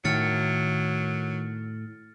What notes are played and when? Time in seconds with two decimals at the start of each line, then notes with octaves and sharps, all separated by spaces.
0.05 A2 D#3 F#3 F6 A6 C#7